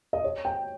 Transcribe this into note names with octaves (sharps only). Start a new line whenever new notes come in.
D#5
C#5
G5